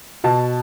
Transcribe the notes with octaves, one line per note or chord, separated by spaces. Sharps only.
B2 A5